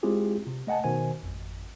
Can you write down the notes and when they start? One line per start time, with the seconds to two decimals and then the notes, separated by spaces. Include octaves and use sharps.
0.03 G#3 C4 E4 F4 G4 G#4
0.47 C3
0.67 A3 D#5 F#5 G#5 A5
0.84 B2 D#3 C5 G#5
1.23 G#1 F2